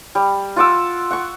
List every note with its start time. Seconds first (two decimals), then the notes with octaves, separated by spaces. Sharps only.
0.15 G3
0.56 F4 F#5 D6 E6
1.11 F#5 C#6